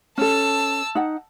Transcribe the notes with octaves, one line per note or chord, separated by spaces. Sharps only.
C#4 A4 A5 E6
D#4 F#5